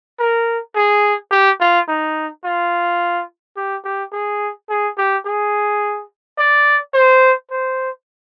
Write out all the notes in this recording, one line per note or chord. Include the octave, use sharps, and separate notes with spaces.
A#4
G#4
G4
F4
D#4
F4
G4
G4
G#4
G#4
G4
G#4
D5
C5
C5